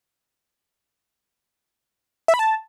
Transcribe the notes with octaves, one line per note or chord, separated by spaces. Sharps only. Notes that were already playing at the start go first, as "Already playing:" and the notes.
E5
B5
A5